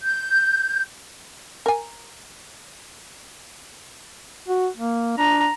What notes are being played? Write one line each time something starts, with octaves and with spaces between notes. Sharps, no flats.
G6
A#4 G#5
F#4
A#3
D4 A#5